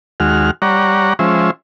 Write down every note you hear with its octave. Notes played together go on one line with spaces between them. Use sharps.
D#2 G#3 F#4 F6
G3 C#5 D5 F#5 A#5
F3 G#3 C#4 C5 E5